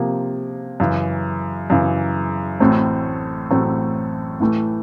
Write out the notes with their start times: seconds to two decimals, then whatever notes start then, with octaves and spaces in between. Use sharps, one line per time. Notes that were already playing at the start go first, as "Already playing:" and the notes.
Already playing: C3 F3 A#3
0.80 F#2 C#3 E3
1.70 F#2 C#3 E3
2.60 A1 A2 F#3 A3 C4
3.51 A1 A2 F#3 A3 C4
4.40 A2 E3 A3